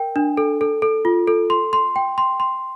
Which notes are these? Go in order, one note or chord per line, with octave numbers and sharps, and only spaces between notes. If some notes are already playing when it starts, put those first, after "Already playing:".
Already playing: A#4 G5
D4
A4
A4
A4
F4
A4
C6
C6
G5
C6
C6